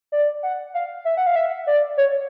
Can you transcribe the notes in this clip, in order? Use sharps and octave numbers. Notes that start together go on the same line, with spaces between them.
D5
F#5
F5
E5
F#5
F5
E5
D5
C#5